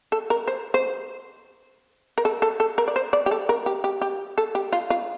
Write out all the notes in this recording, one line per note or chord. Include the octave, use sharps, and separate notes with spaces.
A4
A#4
C5
C5
A#4
A4
A4
A4
A#4
D5
C5
D5
G4
A4
A#4
G4
G4
G4
A4
G4
F4
F4